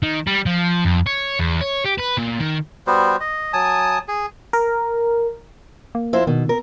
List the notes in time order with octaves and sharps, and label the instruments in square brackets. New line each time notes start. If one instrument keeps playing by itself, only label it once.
[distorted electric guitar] D#3
G3
F3
F2
C#5
E2
C#5
G4
B4
A#2
D#3
[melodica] G3 B3 F#4 C5
D#5
F#3 G#5 A5 D#6
G#4
[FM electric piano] A#4
[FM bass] A#3
[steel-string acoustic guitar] F2 E4 C5
[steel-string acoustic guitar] B2 [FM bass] D#3
[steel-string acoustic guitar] A#4